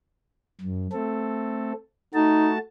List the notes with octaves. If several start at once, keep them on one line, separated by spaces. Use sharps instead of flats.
F#2
A3 C4 A4
A3 D#4 F#4 A5